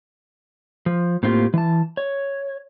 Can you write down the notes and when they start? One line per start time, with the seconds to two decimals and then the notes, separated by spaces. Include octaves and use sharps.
0.86 F3
1.23 A2 A#3 C4 D#4 F4 G4
1.54 E3 A5
1.97 C#5